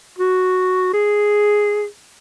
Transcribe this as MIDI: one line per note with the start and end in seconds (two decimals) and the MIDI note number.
0.19 0.91 66
0.93 1.85 68